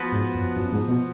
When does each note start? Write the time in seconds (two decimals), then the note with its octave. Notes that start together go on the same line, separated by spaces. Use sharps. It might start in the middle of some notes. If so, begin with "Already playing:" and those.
Already playing: F3 B3 F#4 B4
0.12 G#2
0.35 F#2
0.56 F#2
0.72 G#2
0.88 B2